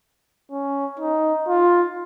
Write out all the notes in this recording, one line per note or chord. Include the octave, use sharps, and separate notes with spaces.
C#4
D#4
F4